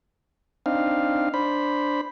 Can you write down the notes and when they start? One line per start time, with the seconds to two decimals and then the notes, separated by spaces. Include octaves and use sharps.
0.66 C4 D4 D#4 F5
1.34 D4 C5 B5